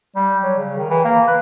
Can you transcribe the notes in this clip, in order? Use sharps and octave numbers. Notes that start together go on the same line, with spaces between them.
G3
F#3
C#3
D#3
E3
A#3
B4